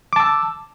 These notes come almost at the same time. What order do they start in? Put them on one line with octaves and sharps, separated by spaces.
D6 A5 E6